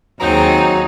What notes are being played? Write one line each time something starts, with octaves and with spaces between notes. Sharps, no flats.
D#2 F#3 C4 D#4 G#4 A#5 G6